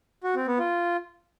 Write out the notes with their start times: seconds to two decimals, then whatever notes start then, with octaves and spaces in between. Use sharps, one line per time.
0.24 F#4
0.35 C4
0.47 B3
0.59 F4